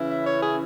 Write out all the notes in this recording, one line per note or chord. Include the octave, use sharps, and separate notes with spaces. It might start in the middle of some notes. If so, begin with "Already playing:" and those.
Already playing: C#3 E3 C#4 E4
E5
C#5
G#4